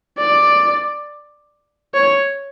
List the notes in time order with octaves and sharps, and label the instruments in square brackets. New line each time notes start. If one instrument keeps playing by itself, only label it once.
[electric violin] D5
C#5